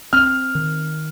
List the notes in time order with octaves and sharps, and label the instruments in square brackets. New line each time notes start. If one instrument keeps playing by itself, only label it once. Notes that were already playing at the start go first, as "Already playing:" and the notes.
[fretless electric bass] C4 [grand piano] F6
[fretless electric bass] D#3